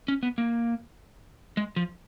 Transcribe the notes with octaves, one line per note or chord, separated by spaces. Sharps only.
C#4
B3
A#3
G#3
F3